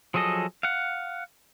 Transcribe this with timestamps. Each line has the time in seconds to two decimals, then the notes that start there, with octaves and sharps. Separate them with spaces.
0.14 F3 F#3 G#4 A4 D#5
0.63 F5 F#5